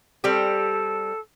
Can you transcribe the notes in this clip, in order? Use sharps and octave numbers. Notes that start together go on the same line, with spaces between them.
G3 C4 G4 A4